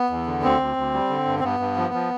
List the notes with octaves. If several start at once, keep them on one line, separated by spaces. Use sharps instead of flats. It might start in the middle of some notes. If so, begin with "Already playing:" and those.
Already playing: B3
E2
D3
D2 C4
D2
D2
G3
D3
G2
C4
G2 B3
G2
F3
F3